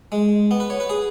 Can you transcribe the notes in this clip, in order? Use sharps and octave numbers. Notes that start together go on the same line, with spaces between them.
G#3
B3
B4
C#5
B4
G#4